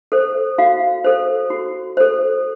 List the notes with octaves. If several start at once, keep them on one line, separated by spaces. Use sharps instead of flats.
A4 C5
F#4 F5
A4 C5
F#4
A4 C5